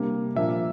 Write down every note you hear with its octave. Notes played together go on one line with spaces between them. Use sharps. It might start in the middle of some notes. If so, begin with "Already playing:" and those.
Already playing: C3 G3 A#3 D4
A#2 F3 A#3 D4 E5